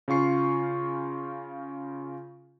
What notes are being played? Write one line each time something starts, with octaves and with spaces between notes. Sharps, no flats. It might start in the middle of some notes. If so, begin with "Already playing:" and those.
C#3 C#4 F4 C#6 C7